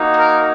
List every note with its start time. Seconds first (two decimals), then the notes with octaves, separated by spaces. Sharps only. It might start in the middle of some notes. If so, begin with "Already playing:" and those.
Already playing: A#3 D#4 F#4
0.17 A#4